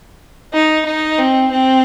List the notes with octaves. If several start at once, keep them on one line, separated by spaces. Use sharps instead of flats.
D#4
D#4
C4
C4